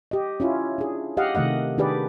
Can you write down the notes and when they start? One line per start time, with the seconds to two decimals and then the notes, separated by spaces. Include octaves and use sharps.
0.11 G4 D#5
0.40 C#4 E4 F4
0.78 D4 G#4
1.17 G4 D#5 F5 F#5
1.35 C3 D#3 A3 D#5 F#5
1.78 D#3 D4 G4 G#4 B4 D5